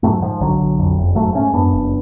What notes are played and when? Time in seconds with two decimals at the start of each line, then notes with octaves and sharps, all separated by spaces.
0.03 G#2 F#3 A3
0.22 G#2 F3
0.40 B1 D3 F#3
0.59 B1
0.79 F2
0.98 F#1
1.15 G#2 F#3 A3
1.34 G#2 A3 C#4
1.53 F#2 B3 D4
1.73 F#1